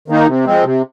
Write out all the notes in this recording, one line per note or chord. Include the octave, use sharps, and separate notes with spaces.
D#3 A#3 D#4
C3
F3 G#3 C4
C3